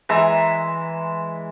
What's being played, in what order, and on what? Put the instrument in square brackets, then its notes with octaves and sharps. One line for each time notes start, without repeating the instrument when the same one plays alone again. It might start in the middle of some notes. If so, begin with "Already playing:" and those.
[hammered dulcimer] E3 G#3 E5 A#5